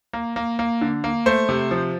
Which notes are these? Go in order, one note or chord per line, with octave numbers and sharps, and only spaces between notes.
A#3
A#3
A#3
D3
A#3
A3 C5
C3
F3